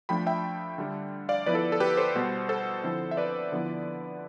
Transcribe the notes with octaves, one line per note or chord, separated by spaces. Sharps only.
F3 A3 D4 G5 B5
E5 G5
D3 G3 D4
D5 F5
F3 B3 E4 B4 D5
A4
A4
G4 B4
A4 C5
B2 G3 B3
A4 C5
D3 F3 C4 E4
E5
B4 D5
D3 F3 B3 E4